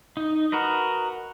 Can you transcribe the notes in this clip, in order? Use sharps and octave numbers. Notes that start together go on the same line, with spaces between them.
D#4
F#4 A#4 B4 D#5